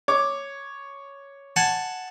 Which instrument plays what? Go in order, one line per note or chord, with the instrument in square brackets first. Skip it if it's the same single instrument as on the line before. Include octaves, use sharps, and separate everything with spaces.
[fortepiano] C#5 D6
[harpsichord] F#5 G#5 A5